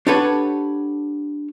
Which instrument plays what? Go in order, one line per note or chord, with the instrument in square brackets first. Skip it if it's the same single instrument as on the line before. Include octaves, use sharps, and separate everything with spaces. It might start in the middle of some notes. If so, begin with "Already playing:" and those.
[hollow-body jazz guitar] D4 G4 A4 B4 C#5 F#5